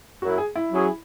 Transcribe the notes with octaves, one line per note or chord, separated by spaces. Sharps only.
F#2 F#3 E4 F#4
G#4
E4
F#3 C#4 G#4